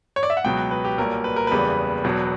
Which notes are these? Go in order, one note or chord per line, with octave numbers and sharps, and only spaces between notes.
C#5
D5
E5
F#5
C#2 B2 F#3 B3 G5
B4
G4
B1 A#2 G3 A#4
B4
A#4
F#1 E2 C#3 G3 B3 B4
E1 E2 B2 F#3